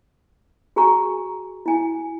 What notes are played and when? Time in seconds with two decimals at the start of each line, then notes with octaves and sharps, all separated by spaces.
0.76 F#4 G#4 G#5 A#5 C#6
1.66 E4 G#5